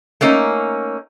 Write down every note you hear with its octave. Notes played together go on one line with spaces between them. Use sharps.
A3 A#3 C#4 D#4